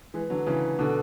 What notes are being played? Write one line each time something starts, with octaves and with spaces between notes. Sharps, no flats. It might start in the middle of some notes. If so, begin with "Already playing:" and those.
E3 G#3 B4
D3 F#3 B4
C#3 E3 B4
B4
B2 D3 A4